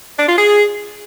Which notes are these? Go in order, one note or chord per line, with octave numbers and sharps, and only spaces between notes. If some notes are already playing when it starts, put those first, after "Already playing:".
D4
F4
G#4